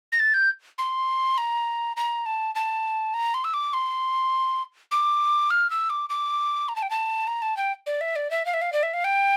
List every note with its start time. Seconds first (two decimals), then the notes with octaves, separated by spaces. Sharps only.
0.12 A#6
0.19 A6
0.34 G6
0.78 C6
1.38 A#5
1.97 A#5
2.26 A5
2.55 A5
3.14 A#5
3.34 C6
3.44 E6
3.54 D6
3.73 C6
4.91 D6
5.50 F6
5.70 E6
5.90 D6
6.10 D6
6.69 A#5
6.76 A5
6.82 G5
6.90 A5
7.27 A#5
7.42 A5
7.57 G5
7.87 D5
8.01 E5
8.16 D5
8.31 E5
8.46 F5
8.54 E5
8.62 F5
8.73 D5
8.83 E5
8.94 F5
9.04 G5